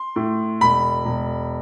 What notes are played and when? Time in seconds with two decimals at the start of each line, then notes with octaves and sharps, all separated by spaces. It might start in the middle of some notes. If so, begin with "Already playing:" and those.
Already playing: C6
0.16 A2
0.61 E1 B5
1.05 E1